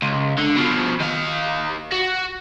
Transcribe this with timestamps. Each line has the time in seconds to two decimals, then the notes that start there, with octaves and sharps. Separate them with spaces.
0.02 C#2
0.38 D3
0.56 B2 F3
1.00 D#3 F5
1.92 F#4